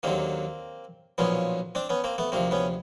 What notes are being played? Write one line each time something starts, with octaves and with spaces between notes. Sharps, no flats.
D#2 D3 F#3 A#3 C4
B1 A#2 F3 B3 C#4
C4 D4
B3 C#4
A#3 C4
A3 B3
D2 C3 F3 A#3 C4
B3 C#4